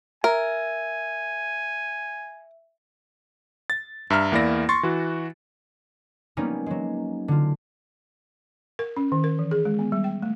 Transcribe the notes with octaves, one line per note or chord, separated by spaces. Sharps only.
A#4 E5 G#5
A6
G2 E5 A#5 F6
E2 A#3 E4 D5 A#6
C6 C#6 A6
E3 F#4
F#3 G3 A#3 B3 C#4 D#4
F#3 G#3
D3 F4
A#4
C#4
D#3
A#4
E3
G#4
G#3
B3
G3
G5
A3